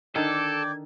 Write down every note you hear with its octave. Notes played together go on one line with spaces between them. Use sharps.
D3 D#3 A4 D5 G5 D6 G#6